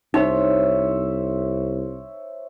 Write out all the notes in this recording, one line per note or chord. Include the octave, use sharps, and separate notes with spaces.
C2 D#4 C5 C#5 E5